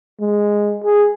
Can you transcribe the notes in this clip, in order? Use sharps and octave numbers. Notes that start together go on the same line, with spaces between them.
G#3
G#4